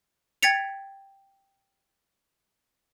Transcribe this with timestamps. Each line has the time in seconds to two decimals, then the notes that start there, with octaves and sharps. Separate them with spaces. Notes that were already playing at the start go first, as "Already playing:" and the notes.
0.43 G5 G#6 A6 B6 C#7 F7